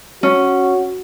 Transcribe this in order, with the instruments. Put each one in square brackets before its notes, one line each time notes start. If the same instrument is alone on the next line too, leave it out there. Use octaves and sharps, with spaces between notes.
[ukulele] C#4 [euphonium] F#4